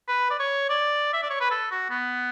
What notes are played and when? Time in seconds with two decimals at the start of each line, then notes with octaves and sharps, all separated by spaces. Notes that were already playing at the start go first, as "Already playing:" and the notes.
0.08 B4
0.30 D5
0.40 C#5
0.69 D5
1.14 E5
1.23 D5
1.30 C#5
1.40 B4
1.51 A4
1.71 F#4
1.90 B3